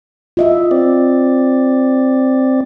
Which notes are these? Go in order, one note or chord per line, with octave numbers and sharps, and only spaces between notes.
F4 D#5 E5
C4 D5